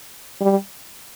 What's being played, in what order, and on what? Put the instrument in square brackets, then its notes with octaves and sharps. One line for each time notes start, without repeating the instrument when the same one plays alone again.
[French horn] G3